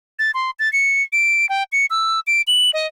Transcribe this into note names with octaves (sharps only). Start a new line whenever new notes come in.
A6
C6
A6
C#7
D7
G5
C#7
E6
D7
F#7
D#5